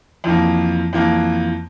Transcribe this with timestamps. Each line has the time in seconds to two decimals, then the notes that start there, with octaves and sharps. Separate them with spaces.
0.24 F2 E3 A#3
0.93 F2 E3 A#3